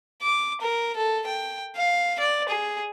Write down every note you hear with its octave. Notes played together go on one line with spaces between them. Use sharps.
D6
A#4
A4
G5
F5
D5
G#4